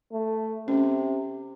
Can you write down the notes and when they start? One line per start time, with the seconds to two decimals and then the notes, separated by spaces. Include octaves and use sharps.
0.12 A3
0.68 C3 C#4